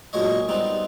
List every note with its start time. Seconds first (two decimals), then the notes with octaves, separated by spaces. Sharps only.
0.13 B1 A#2 G#3 C#5 D#5
0.49 G3 B3 C4 D#4